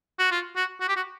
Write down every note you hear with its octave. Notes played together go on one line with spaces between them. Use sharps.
F#4
F4
F#4
F#4
G4
F#4